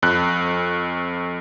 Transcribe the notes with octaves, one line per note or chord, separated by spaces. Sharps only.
F2 F#6